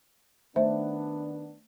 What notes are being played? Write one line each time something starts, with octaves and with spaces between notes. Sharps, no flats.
D#3 A3 B3 D4 C5 E5